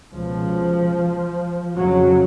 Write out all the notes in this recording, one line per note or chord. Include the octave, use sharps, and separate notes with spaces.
C#2 B2 F3
F2 C#3 F#3